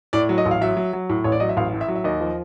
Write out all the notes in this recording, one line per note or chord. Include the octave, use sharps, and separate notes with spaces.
A2 D5
F#3
D#5
A1
F5
F#3 E5
F#3
F#3
A2
A1 C#5
D5
F#3 D#5
E5
A1 F5
A2
E5
F#3
E5
D#2 D#5
F3